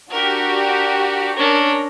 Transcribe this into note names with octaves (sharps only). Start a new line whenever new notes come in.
D4 F#4 G4 A#4
C#4 D4 A#4 A#5